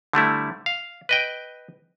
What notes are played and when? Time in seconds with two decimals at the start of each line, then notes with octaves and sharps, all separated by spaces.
0.13 D3 G3 A3 E4
0.66 F5
1.09 B4 D#5 G5